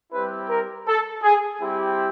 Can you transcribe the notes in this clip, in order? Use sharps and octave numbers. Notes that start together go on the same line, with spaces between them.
G3 C4 E4 G4 B4
A#4
A4
G#4
G3 C4 E4 G4